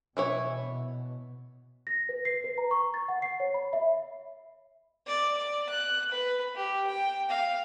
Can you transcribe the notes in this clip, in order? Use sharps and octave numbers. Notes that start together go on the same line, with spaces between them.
B2 E3 E4 C#5
A#6
B4
C7
B4
A#5
C#6
A6
F#5
C7
C#5
B5
E5
D5
D5
F#6
B4
G4
G5
F5